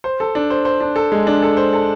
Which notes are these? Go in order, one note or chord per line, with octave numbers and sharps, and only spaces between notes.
C5
A4
D4
C5
C5
D4
A4
G#3
D4
A4
C5
A4